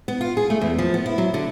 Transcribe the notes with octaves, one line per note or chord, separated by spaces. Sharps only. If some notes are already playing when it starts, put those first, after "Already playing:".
B3
F4
G#4
A3
E2
F3
B3
E4
F#3
D3